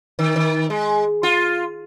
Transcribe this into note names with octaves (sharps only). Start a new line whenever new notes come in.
D#3
D#3
G#3
F4